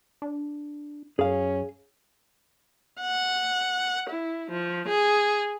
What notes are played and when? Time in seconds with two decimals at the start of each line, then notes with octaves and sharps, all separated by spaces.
0.22 D4
1.19 F#2 C#4 G#4 F5
3.01 F#5
4.09 E4
4.51 F3
4.88 G#4